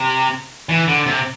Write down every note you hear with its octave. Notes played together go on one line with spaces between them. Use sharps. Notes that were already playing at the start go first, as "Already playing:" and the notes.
Already playing: C3
E3
D3
C3